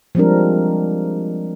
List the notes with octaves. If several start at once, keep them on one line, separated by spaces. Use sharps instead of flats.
F3 G3 G#3 C4 D4 A#4